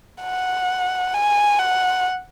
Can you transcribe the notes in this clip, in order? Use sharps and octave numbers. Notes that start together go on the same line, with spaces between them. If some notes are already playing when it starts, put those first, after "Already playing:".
F#5
G#5
F#5